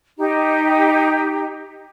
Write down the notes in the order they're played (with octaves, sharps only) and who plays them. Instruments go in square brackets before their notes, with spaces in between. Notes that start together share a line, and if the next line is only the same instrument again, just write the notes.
[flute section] D#4 G4